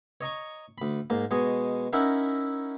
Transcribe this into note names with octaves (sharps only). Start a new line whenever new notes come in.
C#5 D#5 A#5 C#6
D2 B5
G#2 A#3
B2 G#3 C#5 D#5
C#4 D#4 E4 A#4 E5 F#5